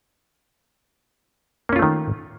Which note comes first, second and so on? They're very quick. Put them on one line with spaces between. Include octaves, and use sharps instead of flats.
A#3 C#4 F4 A3 D#3